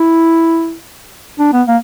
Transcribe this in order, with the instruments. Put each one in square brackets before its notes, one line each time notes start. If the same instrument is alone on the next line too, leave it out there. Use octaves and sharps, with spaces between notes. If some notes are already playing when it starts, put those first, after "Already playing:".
Already playing: [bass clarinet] E4
D4
B3
A#3